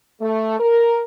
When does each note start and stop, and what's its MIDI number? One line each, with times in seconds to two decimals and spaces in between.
0.21 0.57 57
0.60 1.02 70